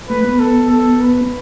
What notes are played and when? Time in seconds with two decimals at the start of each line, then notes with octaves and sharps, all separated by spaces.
0.09 A3 B4
0.24 B3
0.40 A4
0.70 A4
1.01 B4